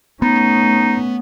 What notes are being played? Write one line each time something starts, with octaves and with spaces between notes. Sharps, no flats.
A3 B3 C#4 D#4